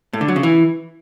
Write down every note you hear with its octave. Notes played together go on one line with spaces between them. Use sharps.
A2
D3
F#3
C#3
E3